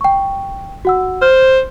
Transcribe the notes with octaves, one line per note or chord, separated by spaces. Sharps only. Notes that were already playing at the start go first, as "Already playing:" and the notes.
G5 C#6
F#4 F#5 E6
C5 F6